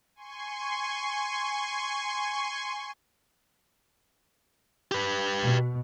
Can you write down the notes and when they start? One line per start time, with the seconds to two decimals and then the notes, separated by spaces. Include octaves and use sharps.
0.15 G#5 C6 C#6
4.91 G4 B4
5.41 B2